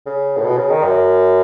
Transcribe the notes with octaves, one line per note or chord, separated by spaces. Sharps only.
C#3
A2
B2
C#3
D#3
F#2